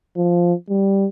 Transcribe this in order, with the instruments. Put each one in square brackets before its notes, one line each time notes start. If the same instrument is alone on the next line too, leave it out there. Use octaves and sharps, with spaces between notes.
[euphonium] F3
G3